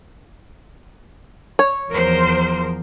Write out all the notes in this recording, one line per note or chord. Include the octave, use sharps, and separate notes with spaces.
C#5
E2 F3 A#4 C5